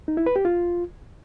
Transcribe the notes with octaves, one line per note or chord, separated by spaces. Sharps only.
D#4
E4
B4
G4
F4